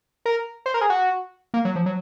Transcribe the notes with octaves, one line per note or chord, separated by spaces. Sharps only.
A#4
C5
A#4
G#4
F#4
A#3
F#3
F3
F#3